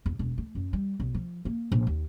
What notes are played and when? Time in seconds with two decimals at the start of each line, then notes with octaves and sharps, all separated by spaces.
0.06 E2
0.19 E1
0.38 A3
0.55 F#2
0.73 G3
1.00 B1
1.14 F3
1.45 A#3
1.72 A#1
1.87 D#2